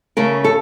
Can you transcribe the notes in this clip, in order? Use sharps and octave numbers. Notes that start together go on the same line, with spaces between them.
C#3 A3 A#4
A4